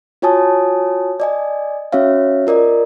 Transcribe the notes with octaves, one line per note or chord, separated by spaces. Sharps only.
F4 F#4 C#5 G#5 A5 D#6
D5 D#5 G#5
C#4 F#4 C#5 E5 F5
F4 A#4 D5 D#5